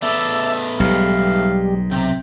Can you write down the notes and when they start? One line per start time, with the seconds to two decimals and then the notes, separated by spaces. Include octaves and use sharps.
0.02 A3 B3 A4 D5 E5
0.80 B1 G#2 G3 F5
1.91 C3 G5